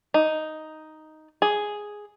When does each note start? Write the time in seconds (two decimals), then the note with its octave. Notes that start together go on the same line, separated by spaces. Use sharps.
0.14 D#4
1.42 G#4